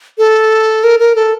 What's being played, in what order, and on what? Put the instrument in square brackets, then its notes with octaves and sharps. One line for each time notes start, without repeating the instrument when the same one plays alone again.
[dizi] A4
A#4
A#4
A4